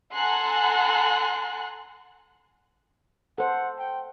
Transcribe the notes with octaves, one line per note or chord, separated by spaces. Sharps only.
A4 F#5 G#5 A#5 C6 F#6
A4 C5 F#5
G5